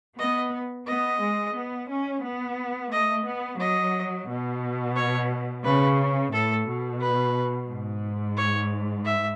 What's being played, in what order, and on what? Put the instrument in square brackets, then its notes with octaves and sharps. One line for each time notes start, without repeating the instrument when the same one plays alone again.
[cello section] B3 [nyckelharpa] D#5
[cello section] B3 [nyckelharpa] D#5
[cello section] G#3
B3
C#4
B3
[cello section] A3 [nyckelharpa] D#5
[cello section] B3
[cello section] F#3 [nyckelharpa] D#5
[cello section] B2
[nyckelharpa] C#5
[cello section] C#3 [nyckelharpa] B4
[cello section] A2 [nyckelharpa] A4
[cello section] B2
[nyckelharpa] B4
[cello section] G#2
[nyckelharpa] C#5
E5